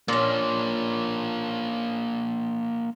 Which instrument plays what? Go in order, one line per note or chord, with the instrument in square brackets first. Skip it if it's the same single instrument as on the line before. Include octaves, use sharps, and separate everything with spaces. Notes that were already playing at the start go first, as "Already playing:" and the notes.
[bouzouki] A#2 C#4 [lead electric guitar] A#3 D4